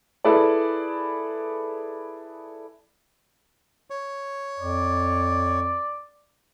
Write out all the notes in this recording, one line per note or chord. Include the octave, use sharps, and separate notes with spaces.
E4 G#4 A4 B4 D5
C#5
F2 D5